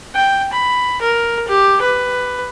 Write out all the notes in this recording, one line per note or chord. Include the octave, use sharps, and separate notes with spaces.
G5
B5
A#4
G4
B4